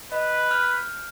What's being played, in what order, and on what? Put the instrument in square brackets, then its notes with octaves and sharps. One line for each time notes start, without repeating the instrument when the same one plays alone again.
[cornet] B4 [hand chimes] D#5
[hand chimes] F6 G6